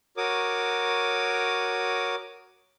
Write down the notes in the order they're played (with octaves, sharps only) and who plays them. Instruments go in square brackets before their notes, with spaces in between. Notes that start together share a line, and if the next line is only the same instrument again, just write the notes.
[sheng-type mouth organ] F#4 A#4 C#5 D6 D#6